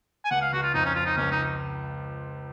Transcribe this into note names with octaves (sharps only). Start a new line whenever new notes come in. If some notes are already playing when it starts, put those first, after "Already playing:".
G#5
C#2 F#5
F5
C#2 F#4
F4
F2 D#4
C#4
F2 F4
D#4
C#2 C#4
D#4